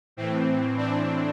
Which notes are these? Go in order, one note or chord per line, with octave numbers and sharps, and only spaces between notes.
A2 E3 C4
C4 D4